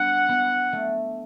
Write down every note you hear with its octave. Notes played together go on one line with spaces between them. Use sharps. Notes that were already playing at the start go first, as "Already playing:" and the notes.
Already playing: G3 B3 D4 F#5
B3
A3